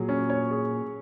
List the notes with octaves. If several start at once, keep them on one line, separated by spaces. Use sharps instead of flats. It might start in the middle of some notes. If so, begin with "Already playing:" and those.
Already playing: A#2 F#3 G#4
C#4
C#5
G#4